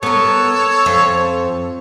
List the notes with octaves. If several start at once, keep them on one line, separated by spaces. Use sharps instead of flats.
B3 A4 A#4 C#5
F2